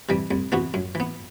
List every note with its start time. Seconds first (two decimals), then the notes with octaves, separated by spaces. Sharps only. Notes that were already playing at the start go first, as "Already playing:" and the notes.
0.09 C3 E3 G3
0.31 C2
0.52 C3 E3 B3 F#4
0.74 F#2
0.95 E3 B3